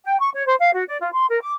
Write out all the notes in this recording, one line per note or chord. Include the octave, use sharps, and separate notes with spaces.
G5
C#6
C#5
C5
F5
F#4
D5
F4
C6
A#4
D6